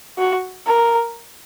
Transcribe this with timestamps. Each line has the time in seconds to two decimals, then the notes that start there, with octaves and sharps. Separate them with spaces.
0.19 F#4
0.67 A#4